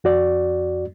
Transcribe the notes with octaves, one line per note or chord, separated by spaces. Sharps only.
F2 F#4 D5